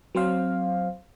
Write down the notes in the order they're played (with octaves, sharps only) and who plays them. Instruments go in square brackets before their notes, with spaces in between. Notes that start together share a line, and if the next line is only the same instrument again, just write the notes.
[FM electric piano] F#3 C4 C5 F5